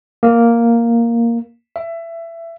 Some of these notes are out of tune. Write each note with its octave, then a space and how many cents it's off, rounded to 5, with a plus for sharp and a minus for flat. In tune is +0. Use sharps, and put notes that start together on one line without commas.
A#3 +0
E5 +20